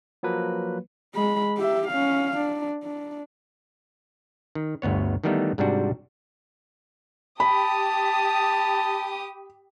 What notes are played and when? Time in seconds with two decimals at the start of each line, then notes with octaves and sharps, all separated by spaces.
0.23 F3 F#3 A#3 B4
1.15 G#3 B5
1.58 G4 E5
1.88 C#4 F5
2.37 D4
2.83 D4
4.55 D#3
4.82 G1 D2 B3 C#5
5.24 D#3 E3 G3 A3 B3 D#4
5.58 G#2 C3 G3 D4 F#4
7.40 G4 A5 B5 D#6